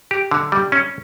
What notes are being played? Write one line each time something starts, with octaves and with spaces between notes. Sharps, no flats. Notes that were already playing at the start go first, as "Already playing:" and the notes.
G4
D3
G3
C#4